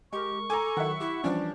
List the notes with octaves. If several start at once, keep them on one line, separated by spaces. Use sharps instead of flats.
G#3 G4 A#4 C#6
A4 G#5 A#5 D6
D#3 F#3 E4 E5 F#5
E4 G4
E3 F3 G3 C#4 D4